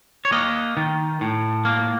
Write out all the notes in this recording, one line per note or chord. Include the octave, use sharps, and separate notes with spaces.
C#5
A#3 D#5
D#3
A2
A#3